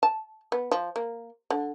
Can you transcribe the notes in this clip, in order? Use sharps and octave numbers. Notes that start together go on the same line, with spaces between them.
A5
B3
F3
A#3
D3